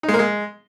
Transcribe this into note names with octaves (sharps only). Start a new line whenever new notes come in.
D#4
G#3
A#3
G#3